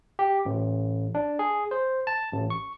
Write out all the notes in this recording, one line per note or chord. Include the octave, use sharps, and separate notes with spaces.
G4
A1
D4
G#4
C5
A5
A1
C#6